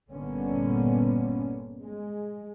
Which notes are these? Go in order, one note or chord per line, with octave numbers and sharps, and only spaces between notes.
G1 A#2 D3 A#3 B3 C#4
G#3